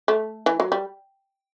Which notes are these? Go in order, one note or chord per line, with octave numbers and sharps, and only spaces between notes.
A3
E3
F#3
G3